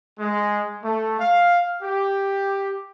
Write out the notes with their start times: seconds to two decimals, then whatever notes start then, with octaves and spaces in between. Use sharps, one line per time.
0.19 G#3
0.84 A3
1.19 F5
1.83 G4